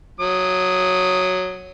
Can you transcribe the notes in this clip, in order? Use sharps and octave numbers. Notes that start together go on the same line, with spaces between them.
F#3 D#6